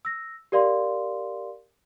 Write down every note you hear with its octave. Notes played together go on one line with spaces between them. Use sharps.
E6 A#6
G4 A#4 D5 F5 C6